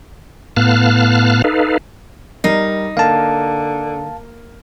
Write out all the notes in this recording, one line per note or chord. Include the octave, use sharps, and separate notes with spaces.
A2 B3 F5 A5 F6 F#6
D#4 A4 B4 F5
G3 D#4 A#4 C7
D3 A#3 F5 A5